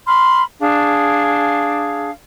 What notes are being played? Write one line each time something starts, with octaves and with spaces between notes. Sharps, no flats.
B5 C6 F6
D4 G#4 F5